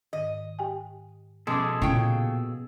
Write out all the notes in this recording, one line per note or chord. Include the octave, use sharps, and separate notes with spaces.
G#2 D#3 D#5
G4 G5 G#5
B2 F3 G#3 C#4 G#4 A4 D6
A#2 C#3 E4 G5